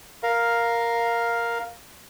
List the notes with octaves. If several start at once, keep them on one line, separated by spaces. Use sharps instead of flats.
A#4 F5